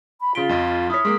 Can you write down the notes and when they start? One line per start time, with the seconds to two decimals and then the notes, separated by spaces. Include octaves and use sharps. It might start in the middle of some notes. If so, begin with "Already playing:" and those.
0.21 B5
0.35 C#3 F4 C6 B6 D7 G7
0.49 F2 D#5
0.90 E4 C#5 D#6 F6 B6
1.05 G#3 A#3 C6 B6